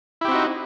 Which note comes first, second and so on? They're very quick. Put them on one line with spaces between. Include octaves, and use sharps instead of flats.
E4 G4 C4 F#4 D#4